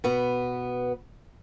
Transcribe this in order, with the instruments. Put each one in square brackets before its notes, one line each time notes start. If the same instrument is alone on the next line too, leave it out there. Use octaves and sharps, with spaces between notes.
[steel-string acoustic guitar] B2 B3